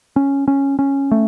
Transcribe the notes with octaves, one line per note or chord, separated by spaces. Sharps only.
C#4
C#4
C#4
A3